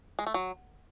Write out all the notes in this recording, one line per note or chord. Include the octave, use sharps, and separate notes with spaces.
G#3
A3
F#3